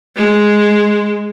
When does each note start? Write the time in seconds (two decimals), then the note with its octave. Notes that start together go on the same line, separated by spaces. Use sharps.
0.16 G#3